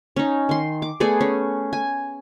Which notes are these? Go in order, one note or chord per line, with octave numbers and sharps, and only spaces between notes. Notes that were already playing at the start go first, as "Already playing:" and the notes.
C#4 D#4
D#3 C6
D6
A3 B3 G#4 D5
C#4
G#5